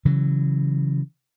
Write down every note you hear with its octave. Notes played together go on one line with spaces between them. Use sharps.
C#3 E3 F#3